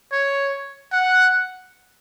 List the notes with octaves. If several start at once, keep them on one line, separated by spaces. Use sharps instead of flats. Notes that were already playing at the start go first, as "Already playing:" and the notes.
C#5
F#5